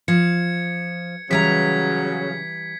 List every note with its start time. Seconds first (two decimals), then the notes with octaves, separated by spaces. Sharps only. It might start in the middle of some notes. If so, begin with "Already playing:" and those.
0.08 F3 G#6 C#7
1.31 C#3 E3 F#3 G3 A#5 G#6 B6